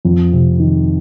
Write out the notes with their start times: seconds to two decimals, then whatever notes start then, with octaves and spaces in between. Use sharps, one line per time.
0.05 F2
0.32 C3
0.59 D#3